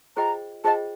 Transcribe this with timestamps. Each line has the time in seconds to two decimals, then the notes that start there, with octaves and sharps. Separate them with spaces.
0.17 F4 G#4 C5 D#5 G5 A#5
0.64 F4 G#4 C5 D#5 G5 A5